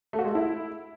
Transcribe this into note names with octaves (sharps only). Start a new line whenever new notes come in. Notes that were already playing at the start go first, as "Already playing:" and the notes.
A3
F#4
G#3
A4
E4